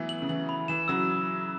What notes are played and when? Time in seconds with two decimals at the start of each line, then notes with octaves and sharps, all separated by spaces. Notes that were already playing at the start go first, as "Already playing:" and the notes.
Already playing: E3 F#3 A3 B3
0.09 F#7
0.22 C#3
0.29 E3 F#7
0.49 B5
0.68 E3 E7
0.88 C#3 F#3 E6